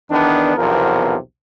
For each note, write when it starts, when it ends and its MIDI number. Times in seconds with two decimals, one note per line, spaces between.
0.10 0.54 40
0.10 0.54 51
0.10 0.54 59
0.10 0.54 62
0.57 1.16 35
0.57 1.16 40
0.57 1.16 48
0.57 1.16 53
0.57 1.16 70